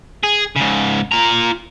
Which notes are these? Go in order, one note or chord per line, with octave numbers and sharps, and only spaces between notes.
G#4
G#2 C#3
F4 A#5